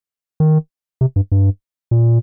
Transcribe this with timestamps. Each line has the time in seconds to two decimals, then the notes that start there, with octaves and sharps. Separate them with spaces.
0.40 D#3
1.01 C3
1.16 G2
1.32 G2
1.91 A#2